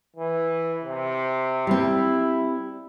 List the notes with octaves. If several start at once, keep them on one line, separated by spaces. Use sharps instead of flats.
E3
C3
G3 C4 E4